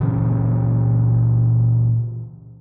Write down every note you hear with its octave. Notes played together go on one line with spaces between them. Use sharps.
A#2 C#3 E3 C#4